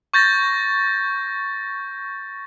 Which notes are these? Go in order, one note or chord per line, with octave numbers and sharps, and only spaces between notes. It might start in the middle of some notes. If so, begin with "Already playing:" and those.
C#6 G6 A6 A#6